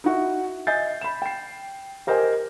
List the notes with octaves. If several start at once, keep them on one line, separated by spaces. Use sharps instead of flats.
D#4 E4 F#4
D#5 E5 G#5 G6 A6 C7
B5 E7
G5 C7
G4 A#4 C5 D#5 G5 G#5